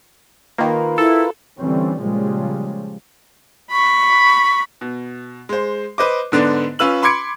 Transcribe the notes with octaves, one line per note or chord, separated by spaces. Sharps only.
D#3 A#3 F4 A#4 B4
E4 A4
D3 E3 G3 C4 C#4
A#2 C#3 F3 G3 G#3
B5 C#6
B2
G#3 C5
B4 C5 D#5 D6
G#2 D3 B3 D4
C#4 F4 B4 E6 F#7
B5 C6 D6 G#6 C#7 D7